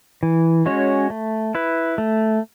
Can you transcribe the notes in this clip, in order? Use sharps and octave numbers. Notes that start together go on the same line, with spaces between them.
E3
G#3 C#4 F#4 C#5
A3
E4 B4
A3